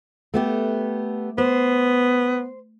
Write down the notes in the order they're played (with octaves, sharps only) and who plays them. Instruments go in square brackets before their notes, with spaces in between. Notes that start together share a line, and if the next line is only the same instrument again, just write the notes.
[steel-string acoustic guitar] A3 B3 G4
[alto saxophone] B3 [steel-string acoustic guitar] C5